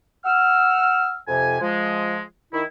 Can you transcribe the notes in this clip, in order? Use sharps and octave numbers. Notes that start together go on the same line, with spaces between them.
F#5 E6 F6
F2 C3 G#5
F3 G#3
D#3 E4